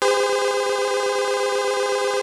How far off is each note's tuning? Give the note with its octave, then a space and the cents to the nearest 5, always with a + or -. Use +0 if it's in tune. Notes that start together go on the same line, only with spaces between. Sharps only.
G#4 -45 C5 -35